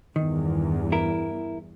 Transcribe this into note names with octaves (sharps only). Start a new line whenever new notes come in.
E2 G2 D#3
E4 A#4